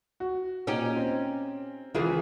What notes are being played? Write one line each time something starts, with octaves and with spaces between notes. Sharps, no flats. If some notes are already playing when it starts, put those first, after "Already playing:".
F#4
A#2 C#4 D#4 G4
C4
C#2 D#3 E3 E4 F4 G#4